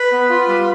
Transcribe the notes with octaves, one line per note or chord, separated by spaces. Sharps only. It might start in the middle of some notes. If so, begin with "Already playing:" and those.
Already playing: B4 B5
B3
F4
G3